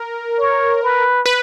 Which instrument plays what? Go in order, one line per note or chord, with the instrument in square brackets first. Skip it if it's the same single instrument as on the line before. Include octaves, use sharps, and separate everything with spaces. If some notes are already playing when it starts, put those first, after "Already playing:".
Already playing: [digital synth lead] A#4
[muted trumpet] C#5
B4
[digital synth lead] B4